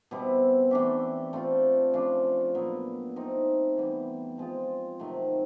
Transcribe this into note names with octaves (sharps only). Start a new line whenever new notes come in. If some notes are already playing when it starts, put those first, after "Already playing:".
B2 G3 C4 E4
E3 A3 D4 G4
A3 C4 F4
C#3 F3 A3 D4
A#2 F#3 B3
A3 C4 D#4
E3 G3 B3
F3 G#3 C4 F4
C3 D#3 F#3 A3